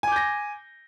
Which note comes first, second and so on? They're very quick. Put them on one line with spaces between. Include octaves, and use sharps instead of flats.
G#5 D6 G6 A#6